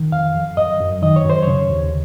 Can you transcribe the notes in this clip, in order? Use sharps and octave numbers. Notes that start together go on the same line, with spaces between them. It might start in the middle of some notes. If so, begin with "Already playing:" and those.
Already playing: D#3
F2 F5
F2
F#2 D#5
F#2
D#3 D#5
C#5
F#2 C5
C#3 C#5
D#2